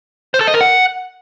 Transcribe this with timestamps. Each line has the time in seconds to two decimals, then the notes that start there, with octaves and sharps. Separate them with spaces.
0.34 C5
0.41 A4
0.47 D#5
0.54 A#4
0.61 F#5